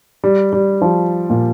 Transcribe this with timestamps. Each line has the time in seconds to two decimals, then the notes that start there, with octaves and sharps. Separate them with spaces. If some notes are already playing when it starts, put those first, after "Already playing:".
0.24 G3
0.53 G3
0.82 F3
1.30 A#2